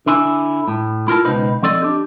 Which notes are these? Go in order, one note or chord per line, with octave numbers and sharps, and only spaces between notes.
D3 D4 E4 G#5
A2
E4 F4 A#4 A5
C#2 B2 D#4 B4 C5
F3 C4 A4 D5 D#5
D4 G4